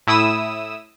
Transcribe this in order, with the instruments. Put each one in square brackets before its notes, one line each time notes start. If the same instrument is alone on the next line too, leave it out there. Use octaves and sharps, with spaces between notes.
[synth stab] A2 E4 D#6 E6 E7